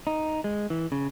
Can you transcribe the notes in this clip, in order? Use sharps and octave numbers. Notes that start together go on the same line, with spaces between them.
D#4
G#3
E3
C#3